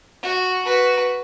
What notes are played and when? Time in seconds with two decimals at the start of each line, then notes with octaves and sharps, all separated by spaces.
0.23 F#4
0.65 F#4 B4